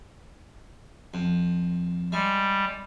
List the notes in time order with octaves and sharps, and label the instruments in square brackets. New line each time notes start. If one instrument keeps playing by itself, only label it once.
[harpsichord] F2
[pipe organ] G3 [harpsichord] G#3